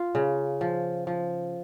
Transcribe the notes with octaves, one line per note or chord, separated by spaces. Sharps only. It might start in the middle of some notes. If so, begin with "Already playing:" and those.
Already playing: F4
C#3
F3
F3